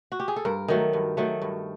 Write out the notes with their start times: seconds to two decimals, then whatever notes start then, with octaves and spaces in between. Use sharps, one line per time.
0.12 F#4
0.20 G4
0.28 G#4
0.36 A4
0.45 G2 A#4
0.68 D#3 F#3 A3
0.93 G2
1.17 D#3 F#3 A3
1.42 G2